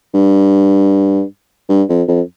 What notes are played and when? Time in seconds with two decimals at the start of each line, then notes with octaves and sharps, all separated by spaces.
0.14 G2
1.69 G2
1.89 F2
2.08 F2